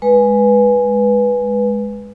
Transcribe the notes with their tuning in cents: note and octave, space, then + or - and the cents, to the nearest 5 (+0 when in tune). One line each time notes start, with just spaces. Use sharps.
G#3 +0 B4 -5